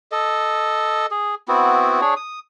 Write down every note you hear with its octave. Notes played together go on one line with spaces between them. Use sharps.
A4 D#5
G#4
B3 C4 E4 F#4
D4 G#4 C#5
D#6